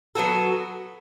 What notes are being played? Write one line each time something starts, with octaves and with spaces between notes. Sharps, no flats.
F#3 B3 F#4 A4